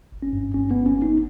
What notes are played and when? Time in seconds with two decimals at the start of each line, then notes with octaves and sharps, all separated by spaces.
0.12 G1
0.22 C#4
0.33 G2
0.54 G1 C#4
0.71 G1 B3
0.86 C#4
0.96 G1
1.02 D#4